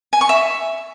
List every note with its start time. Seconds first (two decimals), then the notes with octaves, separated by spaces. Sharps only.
0.13 G#5
0.21 C#6
0.29 E5